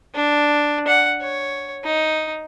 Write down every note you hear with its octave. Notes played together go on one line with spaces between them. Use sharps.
D4
F#5
C#5
D#4